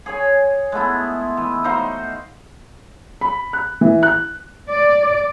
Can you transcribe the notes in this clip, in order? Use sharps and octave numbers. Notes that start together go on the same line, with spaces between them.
G#4 C#5 G#5
G#3 A3 B3 E4
E3
D#4 F#4 C5 F5
B5
F#6
E3
F#6
D5